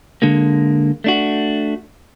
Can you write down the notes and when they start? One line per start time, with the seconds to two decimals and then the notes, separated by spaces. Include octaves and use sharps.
0.22 D3 G#3 A#3
1.04 A3 D4 F#4